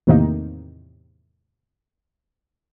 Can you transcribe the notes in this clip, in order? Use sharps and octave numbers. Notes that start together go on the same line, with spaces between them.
E2 A2 C3 D#3 A#3 D#4